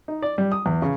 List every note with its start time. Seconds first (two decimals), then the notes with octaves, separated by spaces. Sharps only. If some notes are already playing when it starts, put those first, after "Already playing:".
0.08 D#4
0.22 D5
0.38 G3
0.52 D#6
0.66 E2
0.82 C#3